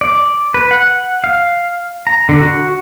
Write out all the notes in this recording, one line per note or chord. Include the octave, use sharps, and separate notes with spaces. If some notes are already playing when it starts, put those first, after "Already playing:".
D5
B4
F#5
F5
A#5
D3
F#4